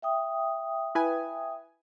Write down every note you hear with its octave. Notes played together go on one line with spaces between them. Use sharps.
E5 G5 D#6
E4 B4 G#5